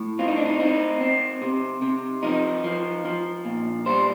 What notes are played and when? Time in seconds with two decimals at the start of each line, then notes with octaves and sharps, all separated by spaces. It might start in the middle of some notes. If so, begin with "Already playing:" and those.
Already playing: A2
0.19 C4 F4
0.28 D#4
0.36 D4
0.45 D#4
0.60 C4 D#4
1.01 C4
1.42 C3
1.82 C3
2.23 F3 D#4
2.64 F3
3.05 F3
3.45 A#2
3.86 G3 C5